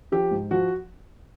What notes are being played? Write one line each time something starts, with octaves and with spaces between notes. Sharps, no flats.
F3 G4
G#2
F3 F#4